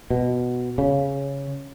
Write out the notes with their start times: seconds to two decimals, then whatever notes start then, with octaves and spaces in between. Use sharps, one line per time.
0.10 B2
0.78 C#3